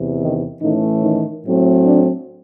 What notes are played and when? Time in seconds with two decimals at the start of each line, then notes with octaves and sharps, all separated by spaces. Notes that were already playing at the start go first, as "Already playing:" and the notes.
Already playing: E2 C3
0.19 D#3 D#4
0.60 A2 D#3 E3 A3 C#4 D#4
1.02 D#3 D#4
1.43 A2 F#3 A3 C4
1.84 D4